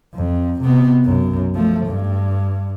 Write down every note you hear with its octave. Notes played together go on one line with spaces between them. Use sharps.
F2
C3 B3
B1 F#2
F3 A3
G2